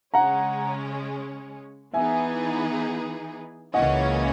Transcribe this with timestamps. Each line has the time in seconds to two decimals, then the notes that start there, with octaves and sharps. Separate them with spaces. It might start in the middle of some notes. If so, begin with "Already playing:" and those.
0.14 C#3 G#3 C#4 F#5 A#5
1.94 E3 B3 D#4 G#4 E5 G#5
3.74 C#2 C#3 E3 A#3 C#4 D#5 F#5